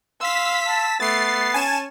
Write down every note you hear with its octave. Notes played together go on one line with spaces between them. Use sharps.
F5 C6 E6 B6
A5
A3 B3 A6 C7
C#4 G#5 A5 E7